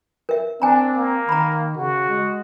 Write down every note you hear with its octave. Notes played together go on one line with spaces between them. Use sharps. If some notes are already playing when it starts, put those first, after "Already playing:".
A#4 E5
C4 D4 G#5 A#5
A#3
D#3 A#5 B5
C#3 F#4
G#3